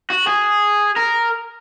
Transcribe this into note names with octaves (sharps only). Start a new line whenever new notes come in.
F#4
G#4
A#4